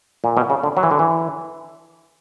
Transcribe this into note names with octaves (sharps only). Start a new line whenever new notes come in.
A#2
B2
C#3
D3
F#3
E3
D3
E3